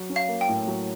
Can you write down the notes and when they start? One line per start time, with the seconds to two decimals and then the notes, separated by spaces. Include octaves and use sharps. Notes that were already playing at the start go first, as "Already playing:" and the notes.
Already playing: F#3
0.09 C#4
0.16 F5
0.28 A#3
0.41 G5
0.48 A2
0.67 F#3